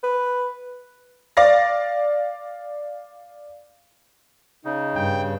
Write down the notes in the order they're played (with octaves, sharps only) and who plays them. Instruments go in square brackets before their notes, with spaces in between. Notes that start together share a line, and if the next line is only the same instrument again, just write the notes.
[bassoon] B4
[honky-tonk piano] D5 F5 A6 A#6
[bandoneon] C#3 [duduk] D#4
[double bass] G2 [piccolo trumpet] G5